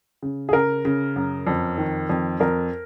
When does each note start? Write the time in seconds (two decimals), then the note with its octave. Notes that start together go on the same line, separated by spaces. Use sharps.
0.22 C#3
0.49 G#4
0.53 C#3 A#4
0.85 C#3
1.16 F#2
1.47 F2
1.78 D#3
2.09 F2
2.40 F2 A#4